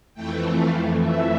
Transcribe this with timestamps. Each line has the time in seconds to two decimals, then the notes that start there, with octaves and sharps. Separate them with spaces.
0.14 F2 E3 A3 G5
0.57 F5
1.00 E5